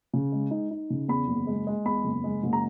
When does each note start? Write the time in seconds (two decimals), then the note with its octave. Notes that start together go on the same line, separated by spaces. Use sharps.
0.13 C#3
0.32 G#3
0.51 D#4
0.71 D#4
0.90 C#3
1.08 E2 B5
1.27 F#1
1.47 G#3
1.67 G#3
1.85 E2 B5
2.04 F#1
2.24 G#3
2.43 F#1
2.53 A#5